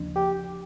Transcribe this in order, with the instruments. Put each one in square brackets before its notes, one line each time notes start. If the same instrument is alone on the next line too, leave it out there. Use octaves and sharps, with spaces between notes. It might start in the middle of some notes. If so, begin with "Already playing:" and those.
Already playing: [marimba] D#2 C#3 F3 A#3 D4
[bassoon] G4